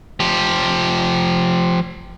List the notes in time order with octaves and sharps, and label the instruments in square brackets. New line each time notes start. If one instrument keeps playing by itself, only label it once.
[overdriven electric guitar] F3 G4